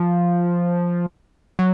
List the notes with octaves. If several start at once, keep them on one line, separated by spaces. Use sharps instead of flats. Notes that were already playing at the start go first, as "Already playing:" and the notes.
Already playing: F3
F#3